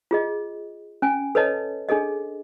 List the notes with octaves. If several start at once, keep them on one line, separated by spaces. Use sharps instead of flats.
F4 G#4 D#5
C#4 G#5
A4 B4 C#5 D#5 A5
D4 G#4 A4 D#5